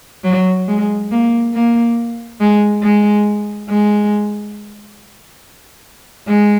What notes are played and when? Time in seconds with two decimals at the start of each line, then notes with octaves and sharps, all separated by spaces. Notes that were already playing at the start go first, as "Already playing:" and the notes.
0.24 F#3
0.68 G#3
1.11 A#3
1.54 A#3
2.41 G#3
2.83 G#3
3.69 G#3
6.28 G#3